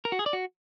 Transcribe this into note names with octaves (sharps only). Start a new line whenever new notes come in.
A#4
F#4
G#4
D5
F#4